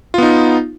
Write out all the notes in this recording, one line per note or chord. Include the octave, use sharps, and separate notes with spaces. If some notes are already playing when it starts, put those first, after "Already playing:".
B3 D#4 F4